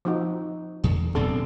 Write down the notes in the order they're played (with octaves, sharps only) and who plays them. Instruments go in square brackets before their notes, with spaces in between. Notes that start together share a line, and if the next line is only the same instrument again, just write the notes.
[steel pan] F3 D#4 F#4
[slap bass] E2 [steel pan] D3
[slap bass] D1 B1 C4 [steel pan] D3 D4 A4